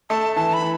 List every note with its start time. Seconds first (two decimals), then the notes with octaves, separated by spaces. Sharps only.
0.10 A3 A5
0.36 E3 A5
0.53 B5
0.62 E3